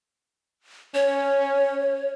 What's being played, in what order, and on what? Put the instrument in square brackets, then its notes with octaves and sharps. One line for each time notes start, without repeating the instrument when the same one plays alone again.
[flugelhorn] C#4 [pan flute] C#5